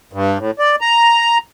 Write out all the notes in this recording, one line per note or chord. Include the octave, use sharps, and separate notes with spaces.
G2
A2
D5
A#5